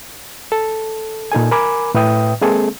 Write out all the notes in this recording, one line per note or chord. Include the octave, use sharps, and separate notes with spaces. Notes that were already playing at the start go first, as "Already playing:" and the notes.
A4
A#2 D#4 A4 G#5
A#4 G#5 B5 D6
A2 B4 E5 G5 D#6
G#3 A#3 C4 G#4 A4